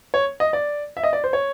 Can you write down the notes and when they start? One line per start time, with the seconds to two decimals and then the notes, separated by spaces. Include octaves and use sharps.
0.14 C#5
0.40 D#5
0.53 D5
0.97 E5
1.03 D#5
1.13 D5
1.24 C5
1.33 C#5